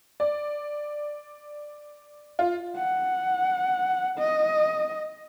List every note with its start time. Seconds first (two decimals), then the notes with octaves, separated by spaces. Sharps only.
0.20 D5
2.39 F4
2.77 F#5
4.19 D#5